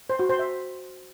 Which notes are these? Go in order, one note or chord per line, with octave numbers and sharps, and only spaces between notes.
C5
F#4
C5
E5